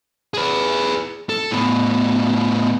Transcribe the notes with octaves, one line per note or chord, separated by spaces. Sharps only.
G#4 B4
A4
A2 B3